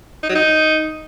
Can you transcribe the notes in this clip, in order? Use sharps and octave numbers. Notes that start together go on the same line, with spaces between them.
D#4
F#3
D#4